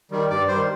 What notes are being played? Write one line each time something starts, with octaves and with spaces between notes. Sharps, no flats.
D#3 G3
G2 D5
D#3 G3 C5